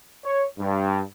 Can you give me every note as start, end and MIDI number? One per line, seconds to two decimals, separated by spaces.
0.24 0.45 73
0.59 1.02 43